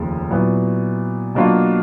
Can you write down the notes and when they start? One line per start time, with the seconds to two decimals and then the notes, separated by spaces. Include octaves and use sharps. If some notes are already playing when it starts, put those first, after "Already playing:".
Already playing: F1 D#2 C#3 F3 G#3
0.30 A#2 F#3 B3 E4
1.35 B2 F#3 A#3 D4 F4